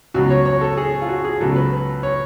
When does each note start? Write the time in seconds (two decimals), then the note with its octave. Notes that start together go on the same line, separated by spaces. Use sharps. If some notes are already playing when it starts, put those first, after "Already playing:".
0.14 C#2 B2 F#3 F#4
0.30 C#5
0.46 C#5
0.61 A4
0.77 G#4
1.02 F4
1.09 F#4
1.25 G#4
1.41 C#2 B2 F#3 A4
1.56 B4
2.03 C#5